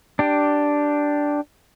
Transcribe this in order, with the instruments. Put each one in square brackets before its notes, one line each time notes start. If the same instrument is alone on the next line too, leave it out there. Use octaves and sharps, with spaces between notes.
[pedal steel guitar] D4 G4